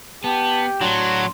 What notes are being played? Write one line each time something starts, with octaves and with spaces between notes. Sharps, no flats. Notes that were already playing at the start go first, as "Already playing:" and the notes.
B3 G4 A5
A2 F#3 D4 C6